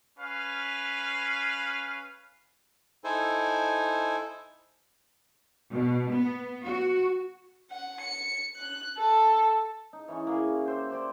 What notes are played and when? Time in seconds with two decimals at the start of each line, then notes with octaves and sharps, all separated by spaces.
0.19 C#4 B4 F5
3.04 D#4 E4 A4 C5 G#5
5.73 B2
6.11 B3
6.64 F#4
7.71 F#5
8.00 C#7
8.56 F#6
8.98 A4
9.93 D#4
10.08 E3 C#4 C#6
10.27 A#3 F#4 G#4
10.65 G4 C5 E5
10.91 G4 C5 D5